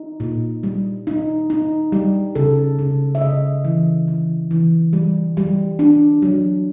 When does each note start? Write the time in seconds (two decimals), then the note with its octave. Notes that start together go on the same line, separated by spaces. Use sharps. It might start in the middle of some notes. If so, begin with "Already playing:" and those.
Already playing: D#4
0.20 A#2
0.63 G3
1.07 D#4
1.50 D#4
1.92 G3
2.35 C#3 A4
2.79 C#3
3.15 E5
3.21 C#3 D#5
3.65 E3
4.08 E3
4.51 E3
4.93 G3
5.37 G3
5.79 D4
6.22 F#3